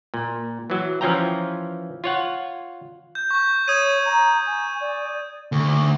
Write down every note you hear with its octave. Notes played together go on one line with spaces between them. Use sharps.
A#2
E3 F#3
E3 F3 C#4 F4 G5 A#5
F4 C#5 F#5
G6
C#6 G6
C#5 D#6 G#6 D#7
A#5
G#5
D5
D2